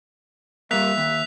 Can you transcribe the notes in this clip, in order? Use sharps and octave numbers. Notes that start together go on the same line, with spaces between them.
G3 A#3 E5 F#6 B6 F7
D#2